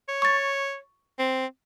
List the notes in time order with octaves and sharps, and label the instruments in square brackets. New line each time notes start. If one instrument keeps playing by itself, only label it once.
[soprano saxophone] C#5
[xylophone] C#6 A6
[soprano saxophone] C4